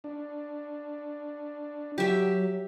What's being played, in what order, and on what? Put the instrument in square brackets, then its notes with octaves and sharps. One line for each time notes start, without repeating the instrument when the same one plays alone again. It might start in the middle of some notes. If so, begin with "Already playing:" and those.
[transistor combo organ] D4
[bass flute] F#3 [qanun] G4 E5